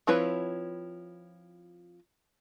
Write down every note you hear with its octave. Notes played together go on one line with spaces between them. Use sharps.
F3 C4 E4 B4 C#5